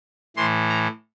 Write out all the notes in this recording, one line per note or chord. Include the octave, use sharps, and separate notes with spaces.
A2 E3 C6
A#5